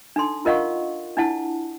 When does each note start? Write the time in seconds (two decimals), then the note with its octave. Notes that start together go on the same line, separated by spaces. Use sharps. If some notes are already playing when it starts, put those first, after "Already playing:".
0.16 D4 D#4 A4 C6
0.45 F4 A#4 D#5 F5 F#5 C#6
1.17 D4 E4 F#5 A5